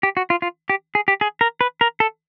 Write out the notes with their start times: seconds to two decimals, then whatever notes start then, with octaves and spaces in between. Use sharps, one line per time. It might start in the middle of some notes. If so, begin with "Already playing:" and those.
0.03 G4
0.17 F#4
0.30 F4
0.42 F4
0.69 G4
0.95 G#4
1.08 G4
1.21 G#4
1.41 A#4
1.61 B4
1.81 A#4
2.00 A4